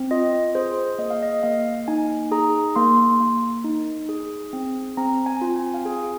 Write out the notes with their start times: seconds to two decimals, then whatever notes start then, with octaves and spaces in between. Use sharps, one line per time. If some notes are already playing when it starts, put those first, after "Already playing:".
Already playing: C4
0.11 F4 D#5
0.55 G#4 C5
0.98 A#3 D#5
1.10 F5
1.23 D#5
1.43 A#3 F5
1.88 D#4 G#5
2.31 G#4 A#5
2.76 A#3 C6
3.20 A#3
3.64 D#4
4.09 G#4
4.53 C4
4.97 C4 A#5
5.26 G#5
5.41 F4
5.56 G#5
5.74 F5
5.86 G#4 G#5